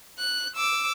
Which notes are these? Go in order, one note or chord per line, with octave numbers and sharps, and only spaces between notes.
F#6
D6 E6